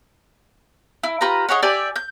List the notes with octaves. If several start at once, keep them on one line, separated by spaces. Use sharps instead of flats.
E4
F4 G4 B4 A#5
D#4 G#4 C#5 F#5
G4 D5 E5 G#5
G6